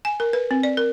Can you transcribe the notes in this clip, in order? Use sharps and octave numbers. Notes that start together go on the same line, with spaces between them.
G#5
A#4
B4
C4
D5
A#4